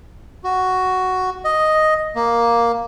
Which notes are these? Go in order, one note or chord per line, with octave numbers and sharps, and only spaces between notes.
F#4
D#5
A#3